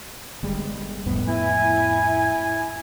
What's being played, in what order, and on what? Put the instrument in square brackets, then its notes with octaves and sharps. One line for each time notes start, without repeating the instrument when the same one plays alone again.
[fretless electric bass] G1 G3 G#3
F2 A2 B3
[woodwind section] E4 G#5